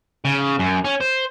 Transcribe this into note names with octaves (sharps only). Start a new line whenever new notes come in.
C#3
F#2
C#4
C5